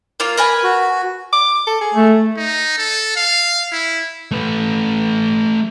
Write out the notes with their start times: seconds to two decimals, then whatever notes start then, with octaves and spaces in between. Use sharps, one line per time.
0.20 A#3 F4 F5
0.37 A#4 B4 G#5
0.64 F#4
1.33 D6
1.67 A4
1.81 G#4
1.95 A3
2.37 D#4
2.78 A4
3.17 F5
3.72 E4
4.32 A3 B4